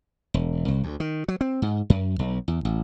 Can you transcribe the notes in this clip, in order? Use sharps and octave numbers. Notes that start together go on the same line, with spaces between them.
E1
C2
D2
D#3
F#3
C4
G#2
F#2
B1
E2
A1